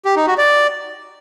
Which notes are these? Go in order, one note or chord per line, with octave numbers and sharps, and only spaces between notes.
G4
D#4
F#4
D5